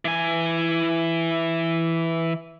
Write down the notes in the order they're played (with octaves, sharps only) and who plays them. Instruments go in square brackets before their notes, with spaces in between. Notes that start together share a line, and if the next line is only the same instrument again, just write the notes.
[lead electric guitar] E3 G#5